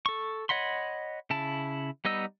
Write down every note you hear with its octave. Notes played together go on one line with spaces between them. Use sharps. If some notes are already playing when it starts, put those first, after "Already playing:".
A4 C#6
C#5 D#5 F#5 B5 C6
C#3 E4 A5
G3 B3 D#4 D#5 E6